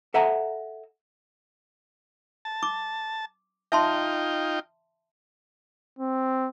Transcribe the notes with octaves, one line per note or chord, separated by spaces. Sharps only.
A4 E5 F#5 G#5 A#5
A5
D6
D#4 F4 E5 G5 A5 C6
C4